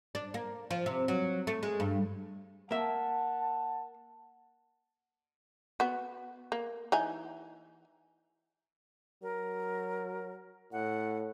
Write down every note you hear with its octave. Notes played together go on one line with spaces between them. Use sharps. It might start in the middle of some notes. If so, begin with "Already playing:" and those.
D4
A#3
F3
C3
F#3
A3
G#3
G2
A#3 E5 F#5 A5
B3 F#4
A#3
E3 D#4 G#5
F#3 A#4
A2 F#5